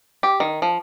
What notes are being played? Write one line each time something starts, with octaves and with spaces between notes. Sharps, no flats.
G4
D#3
F3